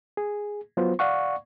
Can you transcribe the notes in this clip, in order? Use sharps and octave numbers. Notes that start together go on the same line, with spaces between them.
G#4
F#3 B3 F4 C5
D5 F5 F#5 C#6